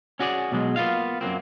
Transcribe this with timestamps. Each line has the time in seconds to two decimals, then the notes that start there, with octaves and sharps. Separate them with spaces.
0.20 C#4 F#4 G#4 D5
0.52 B2 F#3 G#3
0.76 A#3 B3 F4 F5
1.21 F#2 F#3 A#3 C4